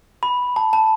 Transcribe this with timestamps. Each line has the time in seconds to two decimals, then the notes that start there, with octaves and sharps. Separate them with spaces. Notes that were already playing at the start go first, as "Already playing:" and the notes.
0.23 B5
0.56 A5
0.73 A5